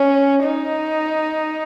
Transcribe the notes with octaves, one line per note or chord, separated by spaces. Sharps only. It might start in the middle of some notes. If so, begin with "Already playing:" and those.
Already playing: C#4
D#4